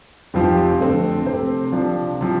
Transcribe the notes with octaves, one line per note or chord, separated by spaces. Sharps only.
F1 F2 F3 C4 G4
F2 D3 A3 C4
C3 A3 C4 A4 C5
C3 F3 D4
C3 F3